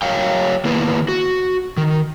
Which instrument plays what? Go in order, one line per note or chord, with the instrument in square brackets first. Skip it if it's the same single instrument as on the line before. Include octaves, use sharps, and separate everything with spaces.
[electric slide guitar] F#3 C#5 F5 G5
D#3 A#3 B3 E4 B4
F#4
D#3